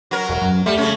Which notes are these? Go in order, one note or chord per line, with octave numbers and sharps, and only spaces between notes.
F#3 A#4
E1
F#2
G3 A3
C#3 C#4